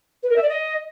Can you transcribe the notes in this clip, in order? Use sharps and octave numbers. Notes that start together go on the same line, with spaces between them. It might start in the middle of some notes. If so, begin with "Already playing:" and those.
B4
A#4
E5
D5
D#5